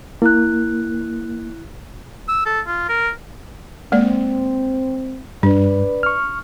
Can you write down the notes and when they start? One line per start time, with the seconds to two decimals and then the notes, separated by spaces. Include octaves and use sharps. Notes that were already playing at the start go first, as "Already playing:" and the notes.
0.22 A#3 E4 F#6
2.28 E6
2.46 A4
2.67 F4
2.89 A#4
3.92 G#3 A#3 C4 D5
5.43 G2 D4 B4 D5
6.03 C#6 F6